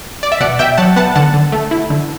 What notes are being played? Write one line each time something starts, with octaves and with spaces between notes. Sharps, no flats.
D5
E5
B2 D5 F#5
B2 E5 G5
F#3 F#5 A5
B3 F#5 A5
D3 F#5 A5
D3
A3
E4
D3